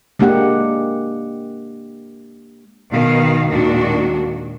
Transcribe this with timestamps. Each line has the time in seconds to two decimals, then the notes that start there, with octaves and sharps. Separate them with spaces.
0.19 G#3 A#3 D4 G4 F#5
2.89 B2 D#3 F5
3.50 D#2 A#2 D#3 G#3 D4 F#4